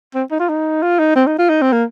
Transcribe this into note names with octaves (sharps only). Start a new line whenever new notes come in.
C4
D#4
F4
D#4
F4
D#4
C4
D#4
F4
D#4
C4
A#3